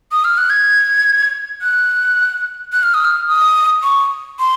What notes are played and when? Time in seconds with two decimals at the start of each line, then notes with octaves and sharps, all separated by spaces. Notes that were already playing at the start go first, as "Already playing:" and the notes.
0.12 D#6
0.24 F6
0.37 F#6
0.50 G#6
1.62 F#6
2.72 F#6
2.83 F6
2.94 D#6
3.04 F6
3.28 D#6
3.83 C#6
4.39 C6